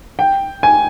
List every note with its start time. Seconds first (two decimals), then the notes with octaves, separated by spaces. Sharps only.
0.19 G5
0.63 G#5